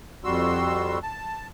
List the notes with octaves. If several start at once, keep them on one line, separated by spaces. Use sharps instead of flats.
F2 G3 F#4 C6 E6
A5